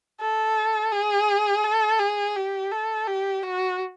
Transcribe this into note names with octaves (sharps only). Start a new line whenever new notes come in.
A4
G#4
A4
G#4
G4
A4
G4
F#4